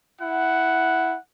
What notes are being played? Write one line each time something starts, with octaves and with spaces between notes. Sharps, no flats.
E4 F#5